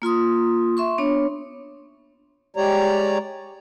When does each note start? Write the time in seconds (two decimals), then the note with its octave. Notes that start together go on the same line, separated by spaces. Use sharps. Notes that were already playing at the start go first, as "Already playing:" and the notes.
0.02 A#3 F4 C6 D#6
0.77 E5 C6 C#6
0.98 B3 D4 C#5
2.56 G#3 G4 C#5 D5 A#5